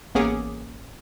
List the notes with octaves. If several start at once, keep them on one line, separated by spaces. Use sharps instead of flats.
A1 A#3 B3 C#4 G#4 D6